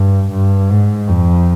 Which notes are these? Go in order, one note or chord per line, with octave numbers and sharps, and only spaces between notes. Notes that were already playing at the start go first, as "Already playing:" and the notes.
Already playing: G2
G2
G#2
F2